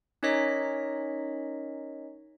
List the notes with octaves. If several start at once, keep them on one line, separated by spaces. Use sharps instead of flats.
C#4 D#4 A#4 C#5 D#5 B6